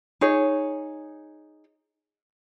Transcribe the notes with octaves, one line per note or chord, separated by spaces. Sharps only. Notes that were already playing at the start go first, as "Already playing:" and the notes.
D#4 G#4 C#5